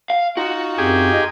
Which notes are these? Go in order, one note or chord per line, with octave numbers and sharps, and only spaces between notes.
F5
D#4 F4 F#4
F#2 C4 G4 G#4
D#5